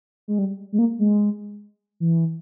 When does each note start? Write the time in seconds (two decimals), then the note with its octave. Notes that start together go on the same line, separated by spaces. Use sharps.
0.28 G#3
0.38 G3
0.72 G#3
0.79 A#3
0.99 G#3
2.00 E3